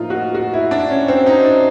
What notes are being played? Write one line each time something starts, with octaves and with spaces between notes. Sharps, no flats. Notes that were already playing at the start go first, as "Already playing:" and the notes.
Already playing: A2 F3 A#3 D#4 F4
F#4
F#4
E4
D4
C#4
C4
D#4
D4